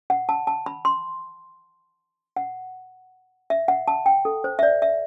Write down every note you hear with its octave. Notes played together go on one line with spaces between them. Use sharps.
F#5
A5
A5
B5
C6
F#5
E5
F#5
A5
G5
A4
C5
E5
D5
E5